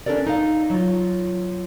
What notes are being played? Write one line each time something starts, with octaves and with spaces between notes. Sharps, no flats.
C#4 D4 F4 A4 A#4 D5
D#4 F5
F#3 F4